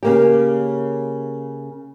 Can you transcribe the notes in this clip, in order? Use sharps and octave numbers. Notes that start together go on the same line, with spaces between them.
C#3 A#3 G4